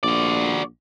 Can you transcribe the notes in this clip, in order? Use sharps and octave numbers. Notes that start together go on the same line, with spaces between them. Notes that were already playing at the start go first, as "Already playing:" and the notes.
A#1 F#4 D5